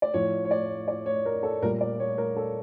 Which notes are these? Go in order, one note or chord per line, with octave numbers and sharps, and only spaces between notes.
D5
A2 F3 C#5
C#5
D5
D5
C#5
A#4
A4
A#2 G3 A#4
D5
C#5
A#4
A4